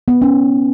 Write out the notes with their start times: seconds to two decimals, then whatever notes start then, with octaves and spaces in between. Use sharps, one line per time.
0.08 B3
0.22 C#4